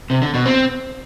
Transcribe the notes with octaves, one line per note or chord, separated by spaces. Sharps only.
C3
D3
B2
C4